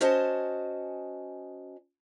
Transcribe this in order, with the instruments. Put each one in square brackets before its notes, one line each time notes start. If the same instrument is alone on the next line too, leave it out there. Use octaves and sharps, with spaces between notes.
[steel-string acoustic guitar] C#4 F#4 C5 D#5 G#5 A5